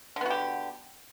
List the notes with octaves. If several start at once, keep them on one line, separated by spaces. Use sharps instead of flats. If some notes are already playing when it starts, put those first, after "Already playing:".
D3 B3 F#4 G4